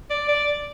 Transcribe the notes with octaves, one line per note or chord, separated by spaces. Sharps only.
D5
D5